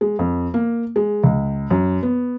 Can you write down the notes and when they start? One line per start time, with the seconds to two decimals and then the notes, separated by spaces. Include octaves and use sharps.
0.01 G#3
0.19 F2
0.54 A#3
0.96 G#3
1.24 C#2
1.71 F#2
2.03 B3